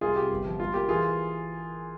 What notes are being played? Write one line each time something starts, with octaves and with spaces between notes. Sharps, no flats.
C2 F4 G#4
C3 G4
G1
F3
G3 F4
A#3 G4
E3 F4 G#4